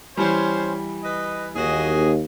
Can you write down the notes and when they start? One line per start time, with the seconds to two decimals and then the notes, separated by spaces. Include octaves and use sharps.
0.17 E3 G3 C#4 C5
1.04 B4 D#5
1.55 D#2 F#4 G#4 D#5